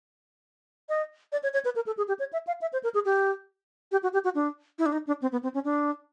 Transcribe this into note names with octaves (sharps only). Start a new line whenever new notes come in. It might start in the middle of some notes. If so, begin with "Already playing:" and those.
D#5
D5
C#5
C#5
B4
A#4
A4
G#4
G4
C#5
E5
F5
E5
C5
A#4
G#4
G4
G4
F#4
G4
F#4
D4
E4
D4
D#4
D4
C4
B3
C4
C#4
D4